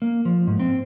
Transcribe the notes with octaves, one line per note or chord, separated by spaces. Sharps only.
A#3
F3
G#2
C4